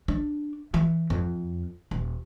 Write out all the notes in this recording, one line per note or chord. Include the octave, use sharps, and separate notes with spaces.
D4
E3
F2
D#1